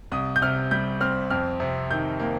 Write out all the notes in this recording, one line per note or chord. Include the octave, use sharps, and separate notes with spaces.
C2 D#6
G6
C3 F6
G3 G6
C4 F6
F2 F6
C3
D#3 G6
A#3